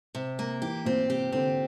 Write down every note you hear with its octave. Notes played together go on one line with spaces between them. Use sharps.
C3
A#3
E3 G4
A#2 C4
C3 G4
D3 C4